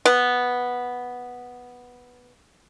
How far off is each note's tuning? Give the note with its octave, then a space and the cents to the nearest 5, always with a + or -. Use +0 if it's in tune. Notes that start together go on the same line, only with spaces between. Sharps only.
B3 -5